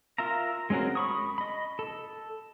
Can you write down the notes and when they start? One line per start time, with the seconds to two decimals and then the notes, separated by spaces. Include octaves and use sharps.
0.18 F4 A#4 E5 F5 A#5
0.70 G#3 C4 C#4 F#4 A#4
0.95 B5 C#6 D#6
1.38 D#5 B5
1.79 A4